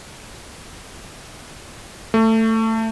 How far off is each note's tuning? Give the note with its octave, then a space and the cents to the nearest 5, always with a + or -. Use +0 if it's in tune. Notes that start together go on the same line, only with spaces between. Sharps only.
A3 +20